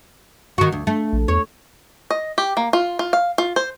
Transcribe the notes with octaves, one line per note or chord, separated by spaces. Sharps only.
D#3 F#4
D2
A3
A#1
E2 C#5
D#5
G4
A#3
F4
F4
F5
F4
C5